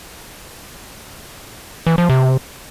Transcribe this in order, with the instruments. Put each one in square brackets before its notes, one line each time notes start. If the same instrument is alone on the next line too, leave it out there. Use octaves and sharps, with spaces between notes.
[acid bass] E3
F3
C3